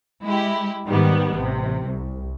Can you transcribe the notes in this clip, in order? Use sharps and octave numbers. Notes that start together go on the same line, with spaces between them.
G#3 E4 G4
G#2 D#3 G3 B3
A1 C3
C2